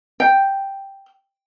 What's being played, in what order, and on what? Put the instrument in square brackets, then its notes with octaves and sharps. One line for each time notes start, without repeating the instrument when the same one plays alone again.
[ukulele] G5